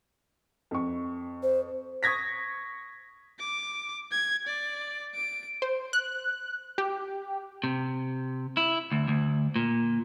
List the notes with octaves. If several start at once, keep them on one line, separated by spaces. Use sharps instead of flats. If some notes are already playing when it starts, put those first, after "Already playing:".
F2 C#6
C5
C#6 D#6 G#6 A#6 B6
D6
G#6
D5
D7
C5
F#6
G4
C3
E4
D2
D2
A#2